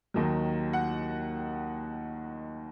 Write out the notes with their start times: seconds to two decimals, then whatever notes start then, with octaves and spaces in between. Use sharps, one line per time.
0.14 D#2 D#3 F#3
0.73 F#5